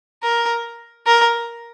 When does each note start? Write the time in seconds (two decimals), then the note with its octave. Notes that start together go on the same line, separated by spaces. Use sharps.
0.23 A#4
1.06 A#4